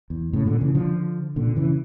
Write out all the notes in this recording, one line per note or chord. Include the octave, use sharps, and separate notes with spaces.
E2
A2 C#3
A#2 D3
C#3 E3
D3 F3
A#2 D3
C#3 E3